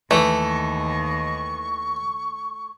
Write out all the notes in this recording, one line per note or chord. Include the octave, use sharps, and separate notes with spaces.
D#2 D#3 E3 A3
C#6